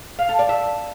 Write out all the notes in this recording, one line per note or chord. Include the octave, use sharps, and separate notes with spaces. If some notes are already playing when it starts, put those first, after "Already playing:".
F5
A4
D5
E5